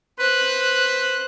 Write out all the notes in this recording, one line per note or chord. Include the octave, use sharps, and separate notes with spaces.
B4 C5 F#6